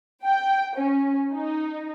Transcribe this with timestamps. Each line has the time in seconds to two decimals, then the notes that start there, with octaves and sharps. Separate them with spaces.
0.24 G5
0.76 C#4
1.33 D#4